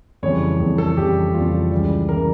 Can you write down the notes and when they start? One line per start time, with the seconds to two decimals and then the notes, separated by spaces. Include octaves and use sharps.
0.23 F2 C#3 E3 G3 C#5
0.60 F2 C#3 E3 G3
0.78 A4
0.97 F2 C#3 E3 G3 G4
1.34 F2 C#3 E3 G3 F4
1.72 C#2 C#3 E3 G3
2.09 C#3 E3 G3 A#4